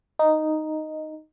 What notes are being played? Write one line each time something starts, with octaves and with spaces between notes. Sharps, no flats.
D#4